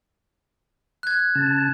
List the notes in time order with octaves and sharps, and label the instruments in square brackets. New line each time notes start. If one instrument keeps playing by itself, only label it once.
[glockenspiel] F#6 G#6
[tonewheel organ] C#3 A5